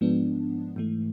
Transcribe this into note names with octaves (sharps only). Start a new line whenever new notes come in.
G#2 F3 G#3 B3 D4
G#2 E3 A3